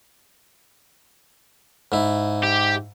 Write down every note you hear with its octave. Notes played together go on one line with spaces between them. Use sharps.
G#2 E4
G4